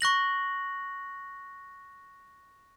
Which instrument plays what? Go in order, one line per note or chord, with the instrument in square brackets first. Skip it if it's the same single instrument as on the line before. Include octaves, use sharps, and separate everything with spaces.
[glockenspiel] C#6 F#6 A#6 F#7